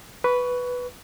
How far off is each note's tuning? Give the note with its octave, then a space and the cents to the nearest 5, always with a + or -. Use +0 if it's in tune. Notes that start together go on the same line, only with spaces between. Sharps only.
B4 +0 C#6 +25